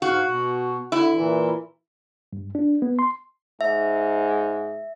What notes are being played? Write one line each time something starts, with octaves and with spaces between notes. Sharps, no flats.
G#2 F#4 F5
B2
D3 E4
A#2 E3
G2
D4
B3
C6
G#2 E5